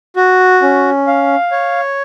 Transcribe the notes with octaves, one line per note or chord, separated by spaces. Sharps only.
F#4
C#4
F5
C#5